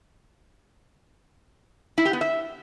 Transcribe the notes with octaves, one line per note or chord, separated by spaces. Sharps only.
E4
G4
B3
E5